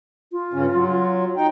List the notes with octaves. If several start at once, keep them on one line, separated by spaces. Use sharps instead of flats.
F4
G2 C#3 C#4
F#3
D#4 G5